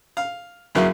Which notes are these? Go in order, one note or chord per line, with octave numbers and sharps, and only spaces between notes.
F5
F#2 C#3 F#3 A#3 E4